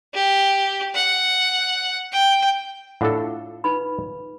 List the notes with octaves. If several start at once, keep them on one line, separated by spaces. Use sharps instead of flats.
G4
F#5
G5
A2 D4 F4 A4 F5 F#5
D#4 B4 B5